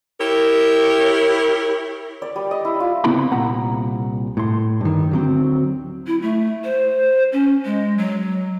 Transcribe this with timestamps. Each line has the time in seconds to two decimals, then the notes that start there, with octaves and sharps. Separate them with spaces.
0.19 E4 G4 A#4 C#5
2.22 D5
2.36 G3
2.51 D#5
2.65 E4
2.80 F4
3.04 C#3 B3 C4 E4 B5 C6
3.31 C2 A#2 F#5 A#5 B5
4.37 A2 C6
4.81 G2 D#3
5.11 D2 F#3 C4
6.07 E4
6.22 A3
6.64 C5
7.33 C#4
7.65 G#3
7.98 F#3